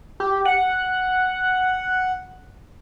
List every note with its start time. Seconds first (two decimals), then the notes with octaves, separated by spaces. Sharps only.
0.20 G4
0.45 F#5